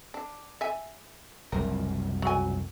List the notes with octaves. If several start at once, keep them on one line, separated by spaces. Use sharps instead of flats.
D4
E5 G#5
F#1 C2 A#4
F#3 G#5